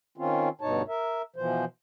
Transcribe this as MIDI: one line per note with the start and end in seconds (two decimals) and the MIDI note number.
0.18 0.49 51
0.18 0.49 60
0.18 0.49 61
0.18 0.49 65
0.61 0.82 38
0.61 0.82 43
0.61 0.82 47
0.61 0.82 63
0.61 0.82 73
0.61 0.82 81
0.88 1.22 70
0.88 1.22 76
1.36 1.65 47
1.36 1.65 52
1.36 1.65 53
1.36 1.65 72